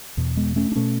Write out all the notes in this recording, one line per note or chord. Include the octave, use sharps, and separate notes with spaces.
E2 B2
G#3 B3
A3 C#4
D4
B2 A3 C#4